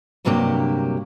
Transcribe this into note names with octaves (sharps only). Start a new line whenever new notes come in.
D2 G2 C3 F#3 A#3 G4